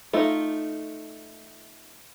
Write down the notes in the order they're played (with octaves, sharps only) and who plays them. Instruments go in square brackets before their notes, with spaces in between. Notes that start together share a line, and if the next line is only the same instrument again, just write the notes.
[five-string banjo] A3 D#4 F4